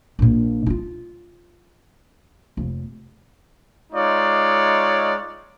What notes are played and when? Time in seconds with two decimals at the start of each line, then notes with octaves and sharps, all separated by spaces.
0.19 A#1 A#2
0.66 D#4 F4
2.57 F1
3.93 G#3 D#4 F4 C#5 D5